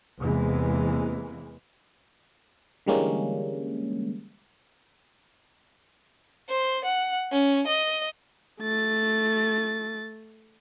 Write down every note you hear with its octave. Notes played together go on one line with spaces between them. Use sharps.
E2 C3 E3 G#3 A#3
D3 E3 G3 G#3 A#3 C#4
C5
F#5
C#4
D#5
A3 A6